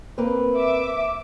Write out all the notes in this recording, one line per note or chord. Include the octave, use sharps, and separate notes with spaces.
A#3 C4 B4
E5 D6